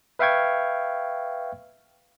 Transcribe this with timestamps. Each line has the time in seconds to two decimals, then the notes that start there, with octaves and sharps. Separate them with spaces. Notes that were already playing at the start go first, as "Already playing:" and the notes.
0.19 B4 E5 F5 G5 C#6 G#6